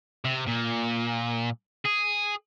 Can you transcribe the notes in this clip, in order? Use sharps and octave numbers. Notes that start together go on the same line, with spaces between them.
C3
A#2
G#4